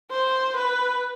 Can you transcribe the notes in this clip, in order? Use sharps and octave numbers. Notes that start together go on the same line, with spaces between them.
C5
B4